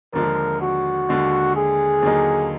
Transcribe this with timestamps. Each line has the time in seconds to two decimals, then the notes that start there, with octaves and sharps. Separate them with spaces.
0.13 D#2 D3 F3 G#3 A#4
0.61 F#4
1.09 D#2 D3 G#3
1.56 G#4
2.02 D#2 D3 F#3 A#3 D#4